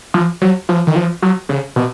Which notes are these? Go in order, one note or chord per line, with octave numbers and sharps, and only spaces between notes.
F3
F#3
F3
D#3
F3
F#3
C#3
B2